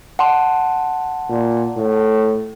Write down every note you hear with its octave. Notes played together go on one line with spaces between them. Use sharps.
F#5 A5 C6
A#2
A2